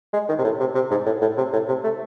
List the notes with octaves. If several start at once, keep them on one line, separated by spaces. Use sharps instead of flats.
G#3
D#3
C3
A2
C3
C3
G#2
A2
A2
C3
A2
C3
A3